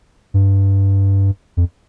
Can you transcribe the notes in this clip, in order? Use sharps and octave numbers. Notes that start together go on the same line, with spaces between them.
G2
F2